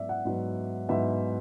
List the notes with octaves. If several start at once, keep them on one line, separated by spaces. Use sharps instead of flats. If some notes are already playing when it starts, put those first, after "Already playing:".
Already playing: G#2 F#3 B3 D5 E5
F#5
G#2 F#3 B3
G#2 F#3 B3 E5